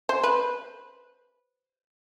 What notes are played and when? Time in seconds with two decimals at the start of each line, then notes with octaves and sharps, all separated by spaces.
0.09 C5
0.23 B4